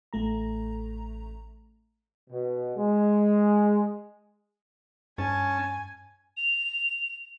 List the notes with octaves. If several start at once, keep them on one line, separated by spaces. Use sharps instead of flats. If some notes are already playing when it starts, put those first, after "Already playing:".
A1 A3 A#5
B2
G#3
G2 C#4 G#5 A5
F7